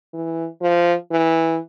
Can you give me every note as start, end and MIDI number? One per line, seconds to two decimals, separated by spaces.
0.14 0.47 52
0.62 0.94 53
1.11 1.59 52